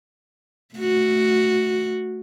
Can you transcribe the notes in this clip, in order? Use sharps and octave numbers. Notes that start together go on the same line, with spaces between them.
A3 F#4